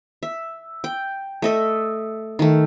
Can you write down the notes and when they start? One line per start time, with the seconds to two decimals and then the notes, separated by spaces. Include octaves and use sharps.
0.23 E5
0.84 G5
1.42 A3 D#5 E5
2.39 D#3 A3